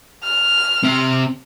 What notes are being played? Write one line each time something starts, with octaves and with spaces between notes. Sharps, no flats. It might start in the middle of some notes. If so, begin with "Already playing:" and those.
F6
C3 C4